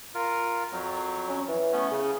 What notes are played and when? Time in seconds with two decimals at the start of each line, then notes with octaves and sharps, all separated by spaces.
0.15 F4 A#4
0.71 F2 F#3
1.28 C#4
1.48 E3
1.72 A3 B3 C#4
1.91 C#3 G#4